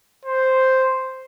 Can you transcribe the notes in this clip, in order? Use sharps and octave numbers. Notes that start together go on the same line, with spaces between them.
C5